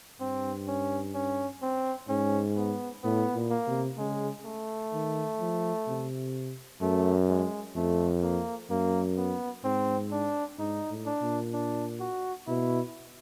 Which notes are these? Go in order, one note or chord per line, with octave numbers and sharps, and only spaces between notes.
G2 C4
C#4
C#4
C4
G#2 C#4
B3
A2 B3
A#2
A#3
C3
C#3 G#3
A3
D#3
F3
C3
F#2 A3
G#3
F2 A3
A#3
F#2 A#3
B3
G#2 C4
D4
G#2 D#4
A2
D4
A#2
D4
F#4
B2 E4